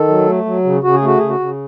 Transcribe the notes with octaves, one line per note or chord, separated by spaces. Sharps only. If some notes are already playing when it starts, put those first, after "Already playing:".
Already playing: D#3 A4
F#3
A3
F#3
C#3
C#3 F#4
G#4
A3 F#4
C#3 G#4
F#4
C#3